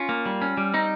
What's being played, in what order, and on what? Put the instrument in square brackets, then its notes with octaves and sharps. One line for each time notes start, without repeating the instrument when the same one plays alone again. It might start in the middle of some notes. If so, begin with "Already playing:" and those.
Already playing: [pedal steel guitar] C#4 F4
A#3
G3
C#4
G3
C4 D#4